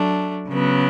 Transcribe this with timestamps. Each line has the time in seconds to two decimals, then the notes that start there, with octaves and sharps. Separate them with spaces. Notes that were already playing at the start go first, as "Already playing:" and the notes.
Already playing: F#3 A3 D4
0.49 C#3 F#3 B3